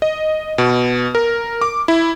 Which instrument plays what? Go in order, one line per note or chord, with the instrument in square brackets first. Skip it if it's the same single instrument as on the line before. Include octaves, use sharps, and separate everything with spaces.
[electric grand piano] D#5
B2
A#4
D6
E4